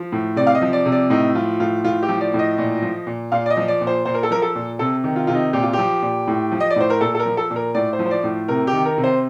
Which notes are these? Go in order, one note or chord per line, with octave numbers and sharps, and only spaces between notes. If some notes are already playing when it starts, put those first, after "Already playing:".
Already playing: F3
A2
C3 D5
F5
D#5
F3
D5
C3
D5
A2 D#4
F3 F4
A2 F4
A2 F4
G4
F3
D5
A2
D#5
A#2
F3
A#2
A#2 F5
D5
D#5
F3
D5
A#2
C5
A#2 C5
A#4
A4
F3 A#4
A4
A#2
C3 A4
D#3
F4
C3 F4
D#4
A#2 G4
F4
F3 G4
A#2
A2
F3
D#5
D5
A2 C5
A#4
A#2 A4
A4
A#4
F3
A4
A#2
A#4
A2 D5
C5
F3
C5
D5
A2
C3 A#4
G4
D#3
A#4
C3
C5